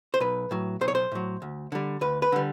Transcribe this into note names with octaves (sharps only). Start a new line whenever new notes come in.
C5
B1 B4
A2 F#3
B1 C5
C#5
C5
A2 F#3
D2
D3 G3
D2 B4
B4
D3 G3